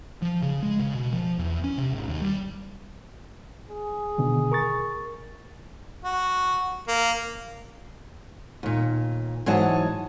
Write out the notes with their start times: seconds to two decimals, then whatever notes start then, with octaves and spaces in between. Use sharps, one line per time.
0.22 F3
0.43 C#3
0.63 G#3
0.79 C#3
0.94 B2
1.13 F3
1.39 E2
1.64 C#4
1.78 C3
1.91 G#1
2.08 D#2
2.21 G3
3.69 G#4
4.18 B2 D3 D#3
4.52 A#4 C#6 A6
6.05 F#4
6.88 A#3
8.63 D#2 A#2
9.46 G#2 E3 F#3 C#5 D#5 A5